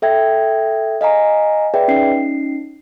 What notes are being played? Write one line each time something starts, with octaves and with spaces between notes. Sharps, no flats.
A4 E5 G5 G#6
D#5 F5 G#5 A#5
G#4 B4 D5 E5 G5
C#4 D#4 C7